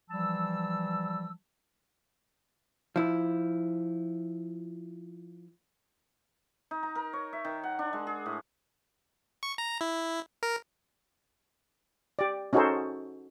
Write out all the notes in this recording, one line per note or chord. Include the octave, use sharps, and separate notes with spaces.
E3 F3 G3 A5 E6
F3 E4
D#4
A#5
A#4
C#5
E5
D#3
F#5
D4
G#3
G#4
A2
C#6
A#5
E4
A#4
G4 D5
C#4 D#4 F#4 G#4 A4 C5